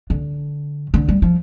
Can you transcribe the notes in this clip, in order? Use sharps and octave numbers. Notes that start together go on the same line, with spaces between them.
D3
D3
G3
F3